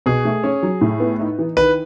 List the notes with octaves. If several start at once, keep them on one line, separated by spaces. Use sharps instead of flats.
B2 G#4
A3
C#4
F#3
A2
B3
D#4
E3
D#3 B4